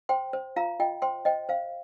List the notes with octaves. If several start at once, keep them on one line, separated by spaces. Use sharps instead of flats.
C5 G5 C6
C5
F4 F5 A#5
F4 D#5 G5
C5 G5 C6
C5 D#5 G5
C5 F5